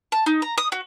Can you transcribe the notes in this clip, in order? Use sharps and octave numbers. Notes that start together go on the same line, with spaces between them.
A5
D#4
A#5
D#6
F#4